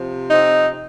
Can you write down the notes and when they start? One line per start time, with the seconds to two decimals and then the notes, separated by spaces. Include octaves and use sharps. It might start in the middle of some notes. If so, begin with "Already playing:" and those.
Already playing: C3 F3
0.31 C4 D#4